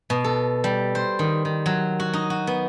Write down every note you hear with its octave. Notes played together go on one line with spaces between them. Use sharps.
B2
A4
G3
C5
D#3
D#3
F#3
F#4
D#4
F#4
B3